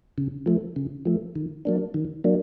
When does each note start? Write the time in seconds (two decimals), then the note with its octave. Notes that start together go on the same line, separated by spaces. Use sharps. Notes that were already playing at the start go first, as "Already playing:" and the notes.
0.18 C#3
0.46 F3 A3
0.76 C#3
1.05 F3 A3
1.36 D#3
1.65 F#3 A#3 D4
1.94 D#3
2.24 F#3 A#3 D4